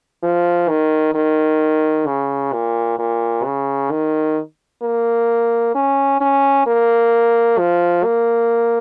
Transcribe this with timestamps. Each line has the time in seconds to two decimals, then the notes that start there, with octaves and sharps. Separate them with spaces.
0.23 F3
0.69 D#3
1.15 D#3
2.07 C#3
2.53 A#2
2.99 A#2
3.45 C#3
3.91 D#3
4.83 A#3
5.75 C#4
6.21 C#4
6.67 A#3
7.59 F3
8.04 A#3